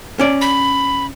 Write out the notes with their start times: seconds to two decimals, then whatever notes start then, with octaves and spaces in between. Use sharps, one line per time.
0.19 C#4 D5
0.41 B5